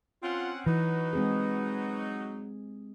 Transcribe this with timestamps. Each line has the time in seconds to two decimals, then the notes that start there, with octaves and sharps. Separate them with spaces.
0.23 C4 C#4 F4 F#5
0.66 E3 F#3 D#4 F#4 B4
1.13 G#3 C4 G#4